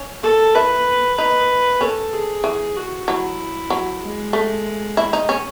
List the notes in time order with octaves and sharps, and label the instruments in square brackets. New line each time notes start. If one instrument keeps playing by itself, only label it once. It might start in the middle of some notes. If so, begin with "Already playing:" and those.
Already playing: [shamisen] C#4
[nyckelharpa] A4
[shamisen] E4 [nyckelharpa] B4
[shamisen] D#4 [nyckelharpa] B4
[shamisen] C#4 [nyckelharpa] A4
[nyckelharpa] G#4
[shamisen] E3
[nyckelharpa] F#4
[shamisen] F#3 [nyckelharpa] E4
[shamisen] F#3
[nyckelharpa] G#3
[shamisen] A3
E4
D#4
C#4